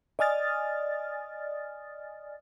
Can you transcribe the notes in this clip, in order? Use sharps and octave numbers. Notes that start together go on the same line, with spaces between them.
D5 D#5 G#5 D#6 F6 A6